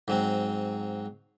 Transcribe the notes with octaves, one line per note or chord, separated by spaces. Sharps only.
G#2 F#3 C4